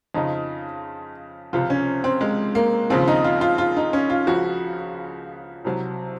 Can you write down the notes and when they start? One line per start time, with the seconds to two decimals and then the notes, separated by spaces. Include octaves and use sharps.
0.14 F2 C#3 F3 D#4
1.53 C#2 C3 F3 F4
1.70 C#4
2.04 C4
2.21 G#3
2.55 A#3
2.90 D#2 C#3 F3 C4
3.08 D#4
3.24 F4
3.41 F4
3.58 F4
3.76 D#4
3.93 C#4
4.10 F4
4.27 C#2 C#3 F3 F#4
5.65 C2 C3 F#3